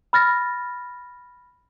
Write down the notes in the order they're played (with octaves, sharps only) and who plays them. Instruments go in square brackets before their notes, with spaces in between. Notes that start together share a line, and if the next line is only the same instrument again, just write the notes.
[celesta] B5 F6 A6 A#6